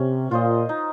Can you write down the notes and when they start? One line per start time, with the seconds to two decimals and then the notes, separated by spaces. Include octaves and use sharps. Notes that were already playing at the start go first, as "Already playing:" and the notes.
Already playing: C3 C#4
0.31 A#2 F4 C5 D#5
0.69 D#4